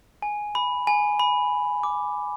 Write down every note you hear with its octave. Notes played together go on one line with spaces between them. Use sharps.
G#5
B5
G#5
B5
D6